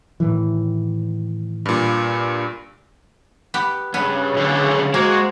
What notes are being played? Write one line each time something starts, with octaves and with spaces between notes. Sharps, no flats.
A2 D#3 E3
G2 A#2
B3 G4
G2 C#3 B3
B1 D3
G#3 A#3 F#4 C5